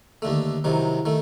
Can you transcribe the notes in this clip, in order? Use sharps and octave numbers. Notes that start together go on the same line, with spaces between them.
D#2 D3 A3
C2 C3 D#3 F#3
D#3 A3